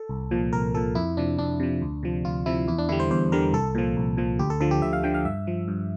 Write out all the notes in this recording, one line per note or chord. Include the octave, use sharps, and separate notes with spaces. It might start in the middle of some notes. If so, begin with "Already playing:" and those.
Already playing: A4
C2
A#2 F3
C2 A#4
A#2 F3 A4
F2 E4
C3 F3 D4
F2 D4
C3 F3
D2
C3 F3
D2 F4
C3 F3 E4
E2 E4
D4
D3 G3 E4
C5
E2 C5
D3 G3 A#4
C2 A4
A#2 F3
C2
A#2 F3
D2 G4
A4
D3 F3 A4
G4
D2 E5
F5
D3 F3 G5
F5
G2 E5
F3
G2